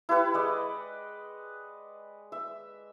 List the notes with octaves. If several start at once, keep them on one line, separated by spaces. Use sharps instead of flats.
E4 G4 B4 F#5
G#3 D5 D#5
E5